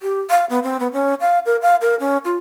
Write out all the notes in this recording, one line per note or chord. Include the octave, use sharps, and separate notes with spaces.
G4
F5
B3
C4
B3
C#4
F5
A#4
F5
A#4
C#4
F4